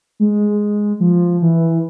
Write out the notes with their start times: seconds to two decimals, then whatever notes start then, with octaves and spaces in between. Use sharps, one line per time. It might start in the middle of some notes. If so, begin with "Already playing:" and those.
0.20 G#3
1.00 F3
1.42 E3